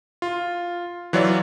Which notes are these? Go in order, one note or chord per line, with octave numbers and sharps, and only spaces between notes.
F4
E3 F#3 F4 C#5 D5